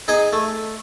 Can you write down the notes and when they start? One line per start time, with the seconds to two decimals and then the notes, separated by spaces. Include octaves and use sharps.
0.08 D#4 G#4 D#5
0.33 A3